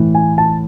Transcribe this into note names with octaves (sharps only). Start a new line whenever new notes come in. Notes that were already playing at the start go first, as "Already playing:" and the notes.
Already playing: A2 E3
G#5
A5